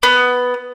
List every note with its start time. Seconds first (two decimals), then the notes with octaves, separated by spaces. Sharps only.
0.03 B3